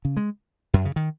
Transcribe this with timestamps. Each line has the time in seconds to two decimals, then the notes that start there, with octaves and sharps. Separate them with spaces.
0.05 C#3
0.17 G#3
0.74 F#2
0.85 C#3
0.96 D#3